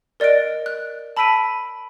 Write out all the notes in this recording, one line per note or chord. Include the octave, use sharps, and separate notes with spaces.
A#4 D5 D#5 F#6 D7
F#6
A5 B5 E6 B6 D7 D#7